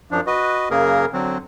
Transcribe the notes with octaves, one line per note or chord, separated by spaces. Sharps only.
F#2 F3 D4
F#4 B4 D#5
F#2 C#3 A#3 G#4 A#4
D3 F#3 C4